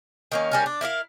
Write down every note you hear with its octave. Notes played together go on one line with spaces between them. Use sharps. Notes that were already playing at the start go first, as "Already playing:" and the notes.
D#3 A#3 C#4
G3 C#4 A#4
D4
E4 A#4 D#5 F5